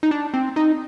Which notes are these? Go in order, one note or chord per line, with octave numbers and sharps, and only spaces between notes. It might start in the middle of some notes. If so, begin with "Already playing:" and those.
D#4
D4
C4
D#4